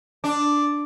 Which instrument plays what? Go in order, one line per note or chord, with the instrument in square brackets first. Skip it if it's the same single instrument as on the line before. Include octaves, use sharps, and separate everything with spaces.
[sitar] D4